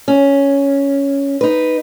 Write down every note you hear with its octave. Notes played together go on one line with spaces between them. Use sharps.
C#4
D#4 B4